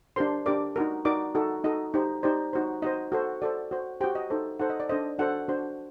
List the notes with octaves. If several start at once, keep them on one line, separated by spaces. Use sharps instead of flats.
D4 G4 A#4 C5 C6
D4 G4 A#4 D5 D6
D#4 F#4 A#4
D#4 F#4 A#4 D5 D6
D#4 F#4 A4
D#4 F#4 A4 D#5
D#4 G4 C5
D#4 G4 C5 D5
D#4 F#4 C5
D#4 F#4 C5 D#5
F#4 A4 C5
F#4 A4 C5 D5
F#4 C5
F#4 G4 C5 G5
D#5
D#4 A4 C5
D#4 A4 C5 F#5
D#5
D5
D4 A4 C5 D#5
D4 F#4 A4 C5 F#5
D4 F#4 C5